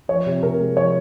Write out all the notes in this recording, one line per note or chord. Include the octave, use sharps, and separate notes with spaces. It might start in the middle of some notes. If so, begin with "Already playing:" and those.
F3 C#5
C3
C3 A#4
G#3
F3 C#5